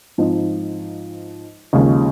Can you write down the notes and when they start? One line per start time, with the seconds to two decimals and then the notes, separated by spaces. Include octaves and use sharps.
0.18 G#2 F3 C4 D#4
1.73 D#2 C#3 F3 G#3 C#4